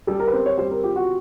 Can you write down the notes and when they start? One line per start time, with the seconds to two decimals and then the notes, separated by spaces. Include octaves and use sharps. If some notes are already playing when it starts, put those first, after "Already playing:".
0.07 G3 A4
0.20 A#4
0.28 B4
0.32 C4 A#4
0.46 C#5
0.58 G3 C5
0.71 A#4
0.83 F4 G4
0.96 F#4